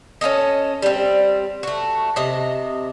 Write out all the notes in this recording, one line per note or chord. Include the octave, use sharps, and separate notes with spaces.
C#4 E4 A4 D#5
G3 C4
A3 F#4
C3 D#5